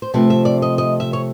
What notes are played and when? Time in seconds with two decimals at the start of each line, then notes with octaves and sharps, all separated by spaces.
0.02 C5
0.14 C3 F3 A3 C4 B4
0.30 E5
0.45 D5
0.62 D#5
0.78 D#5
1.00 E5
1.13 C#5